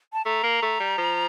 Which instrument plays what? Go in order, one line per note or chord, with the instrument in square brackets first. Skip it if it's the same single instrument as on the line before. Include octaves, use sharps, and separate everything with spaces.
[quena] A5
[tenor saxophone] A3 [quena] A#5
[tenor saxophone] A#3
A3
G3
F3